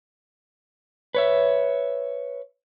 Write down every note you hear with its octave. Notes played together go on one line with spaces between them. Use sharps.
B4 C#5 E5